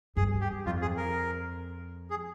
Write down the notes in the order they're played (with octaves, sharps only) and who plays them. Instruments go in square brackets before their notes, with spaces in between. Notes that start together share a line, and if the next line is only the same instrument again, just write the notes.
[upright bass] G2 [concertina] G#4
[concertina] G4
[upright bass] F2 [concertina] F4
[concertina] G#4
A#4
G#4